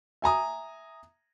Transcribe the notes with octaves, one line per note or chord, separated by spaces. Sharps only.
E5 G#5 A#5 D#6